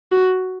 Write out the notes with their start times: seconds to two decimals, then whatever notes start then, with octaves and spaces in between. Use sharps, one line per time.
0.12 F#4